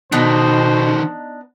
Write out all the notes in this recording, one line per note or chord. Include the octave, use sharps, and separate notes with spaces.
B2 D3 D#3 B3 D4 D#4 C5